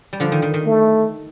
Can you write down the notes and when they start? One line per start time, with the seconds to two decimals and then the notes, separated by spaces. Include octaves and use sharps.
0.13 G3
0.20 D3 F3
0.32 D#3
0.42 D#3
0.54 D#3
0.65 A3